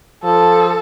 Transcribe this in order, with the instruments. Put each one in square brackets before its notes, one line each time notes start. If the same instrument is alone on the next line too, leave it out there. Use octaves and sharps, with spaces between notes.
[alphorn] F3 [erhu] A4